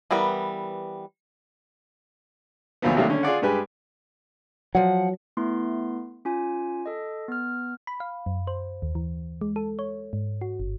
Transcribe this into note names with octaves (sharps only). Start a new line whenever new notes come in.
E3 G3 B3 A#4
D2 F3 F#3 A#3 B3
C3 D#3 F#3 G3 A3 A#3
D3 C#4
F4 G#4 D5 F#5
G2 G#3 G4 B4 G#5
F3 F#3 F#5
A3 B3 E4 C6
C#4 F4 G#5
A4 D#5
B3 F6
B5
F5
F#2
C5
D#2
E3
G#3
A4
C#5
G#2
F#4
G1